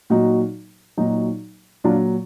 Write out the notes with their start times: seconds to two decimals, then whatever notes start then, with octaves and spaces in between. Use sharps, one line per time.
0.10 A#2 F#3 D#4 F#4
0.98 A#2 F#3 D#4 F#4
1.84 A#2 F#3 D4 F4